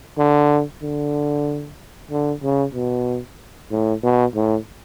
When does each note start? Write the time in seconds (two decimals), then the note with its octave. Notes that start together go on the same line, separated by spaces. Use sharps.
0.18 D3
0.82 D3
2.11 D3
2.43 C#3
2.74 B2
3.71 A2
4.03 B2
4.35 A2